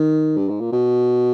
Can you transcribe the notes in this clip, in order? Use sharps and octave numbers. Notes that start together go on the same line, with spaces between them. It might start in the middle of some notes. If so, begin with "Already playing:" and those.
Already playing: D#3
G2
G#2
A#2
B2